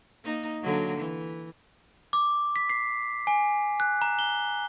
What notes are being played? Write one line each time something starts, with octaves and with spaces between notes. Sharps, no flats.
A#3 D#4
D3 F#3 A#3
E3
D6
B6
C7
G#5
F#6
A#5
G7